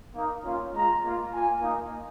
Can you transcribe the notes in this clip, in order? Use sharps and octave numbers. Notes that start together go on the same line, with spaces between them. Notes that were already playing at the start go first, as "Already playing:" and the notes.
A#3 D#4
A#3 C#4 F4
G#3 F4 A#5
A#3 F4
A#3 F4 G#5
A#3 D#4